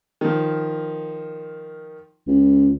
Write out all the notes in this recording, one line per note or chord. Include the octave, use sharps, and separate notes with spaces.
D#3 F3
C#2